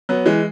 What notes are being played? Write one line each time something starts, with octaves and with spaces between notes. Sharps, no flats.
F#3 B3
E3 G#3